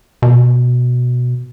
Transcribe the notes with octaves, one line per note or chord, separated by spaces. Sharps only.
B2